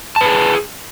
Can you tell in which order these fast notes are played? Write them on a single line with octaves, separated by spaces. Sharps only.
A5 B4 G#4